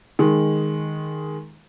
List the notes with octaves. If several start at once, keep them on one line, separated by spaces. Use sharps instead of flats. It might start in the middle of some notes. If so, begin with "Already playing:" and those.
D#3 G#3